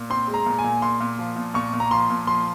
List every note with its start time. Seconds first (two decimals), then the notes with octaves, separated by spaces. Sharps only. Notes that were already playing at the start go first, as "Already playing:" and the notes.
Already playing: A#2
0.10 C4 C6
0.28 G#3
0.34 A#5
0.46 A#2
0.58 G#5
0.64 A#2
0.82 A#2 C6
1.00 A#2
1.19 F3
1.36 A#2
1.54 A#2 C#6
1.73 A#2
1.80 A#5
1.91 F3 C6
2.10 A#2
2.27 F3 C6